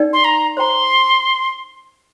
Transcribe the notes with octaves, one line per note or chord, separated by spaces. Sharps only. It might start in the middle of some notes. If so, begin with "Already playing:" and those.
Already playing: D#4 A#4 D5 G5
C6
A#5
C5 G5 A#5 C6